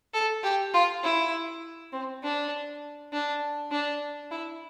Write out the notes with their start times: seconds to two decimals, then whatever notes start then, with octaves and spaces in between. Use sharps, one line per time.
0.14 A4
0.43 G4
0.74 F4
1.03 E4
1.92 C4
2.23 D4
3.13 D4
3.71 D4
4.31 E4